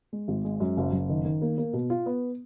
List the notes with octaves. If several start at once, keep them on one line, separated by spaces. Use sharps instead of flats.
G#3
G#1
G#3
F#2
F#1
F#1
D#3
D#3
A#3
A#3
B2
F4
B3